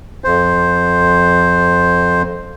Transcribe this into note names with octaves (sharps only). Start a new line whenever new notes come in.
F2 C5